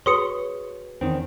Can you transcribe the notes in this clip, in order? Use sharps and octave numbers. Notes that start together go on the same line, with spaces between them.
F#4 G#4 B4 C#5 C6 D#6 C#7
E2 D#3 C4 C#4